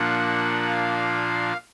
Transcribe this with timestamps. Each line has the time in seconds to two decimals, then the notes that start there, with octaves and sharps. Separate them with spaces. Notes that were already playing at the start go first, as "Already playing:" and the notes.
Already playing: A#2 F3 A#3 D4 F#5
0.66 F5